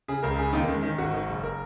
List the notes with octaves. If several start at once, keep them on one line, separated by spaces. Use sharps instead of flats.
C#3 G#4
C#2 A#4
C#3 G#4
D#2 D#4
A#3
D#3 G#3
D#3 C#4
G#1 F#4
D#3
F#1
A#4